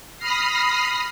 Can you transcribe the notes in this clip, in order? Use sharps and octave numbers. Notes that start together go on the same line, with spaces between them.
B5 D#6 F6 A#6 C7